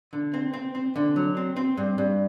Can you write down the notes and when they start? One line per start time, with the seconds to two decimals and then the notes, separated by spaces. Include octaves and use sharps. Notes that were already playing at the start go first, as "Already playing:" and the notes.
0.13 D3
0.34 C4
0.54 C4
0.75 C4
0.96 D3
1.16 F#3
1.37 C4
1.56 C4
1.77 G2
1.98 G2